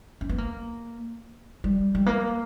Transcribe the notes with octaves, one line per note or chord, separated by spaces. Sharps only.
C#4
B3
A#3
G3
G3
A#3